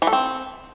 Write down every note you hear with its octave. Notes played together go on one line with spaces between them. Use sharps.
E3
A4
C4